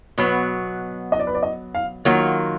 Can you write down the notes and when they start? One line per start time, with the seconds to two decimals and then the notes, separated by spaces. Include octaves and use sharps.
0.18 B2 F#3 B3 B4
1.12 D#5
1.20 D5
1.27 B4
1.35 D5
1.43 D#5
1.75 F5
2.05 D#3 F#3 A#3 F4 F#5